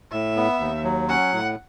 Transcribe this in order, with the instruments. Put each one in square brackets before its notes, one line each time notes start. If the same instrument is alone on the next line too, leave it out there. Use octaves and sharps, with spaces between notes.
[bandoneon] A2 [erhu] E5
[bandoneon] B3
D#2
F#3
[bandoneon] C#4 [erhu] F#5
[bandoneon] A2